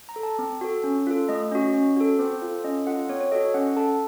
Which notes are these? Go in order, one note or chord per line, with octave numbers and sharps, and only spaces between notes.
A#5
A4
A5
C4
F#4 A4
C#4
F4 A4
A3 D#5
C#4 F#4
C#4
F#4 A4
C4 C5
F4 A4
C#4 D#5
F4 A4 F#5
C4 C#5
C#5
F#4 A4 D#5
C#4 F#5
A4 A5